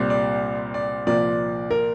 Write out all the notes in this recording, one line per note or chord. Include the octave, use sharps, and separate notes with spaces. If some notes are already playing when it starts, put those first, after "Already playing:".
Already playing: C2 A#2 G3 C4 D5
D5
D5
C2 A#2 F3 A#3 D5
A#4